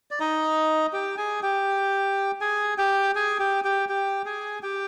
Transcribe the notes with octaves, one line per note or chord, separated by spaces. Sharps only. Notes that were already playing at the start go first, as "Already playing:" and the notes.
D5
D#4 D#5
G4 G5
G#4 G#5
G4 G5
G#4 G#5
G4 G5
G#4 G#5
G4 G5
G4 G5
G4 G5
G#4 G#5
G4 G5